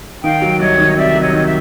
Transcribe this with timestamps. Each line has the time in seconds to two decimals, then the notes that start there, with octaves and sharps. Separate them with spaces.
0.23 D#3 F5 G5
0.42 F#3
0.59 C2 C#5 D#5
0.78 D#3
0.96 C3 D5 E5
1.15 F#3
1.21 C#5 D#5
1.33 D#3
1.45 E5